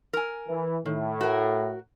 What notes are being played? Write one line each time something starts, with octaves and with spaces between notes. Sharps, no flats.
A#4 G#5
E3
A2 D#3
F#4 A#4